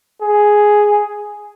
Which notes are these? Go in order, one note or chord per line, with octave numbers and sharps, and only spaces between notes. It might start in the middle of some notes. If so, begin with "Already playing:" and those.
G#4